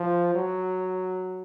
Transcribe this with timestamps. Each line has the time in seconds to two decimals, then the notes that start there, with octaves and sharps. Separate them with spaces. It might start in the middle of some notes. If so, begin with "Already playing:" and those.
Already playing: F3
0.35 F#3